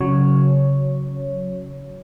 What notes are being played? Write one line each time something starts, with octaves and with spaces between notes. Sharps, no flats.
C#3 F#3 C#5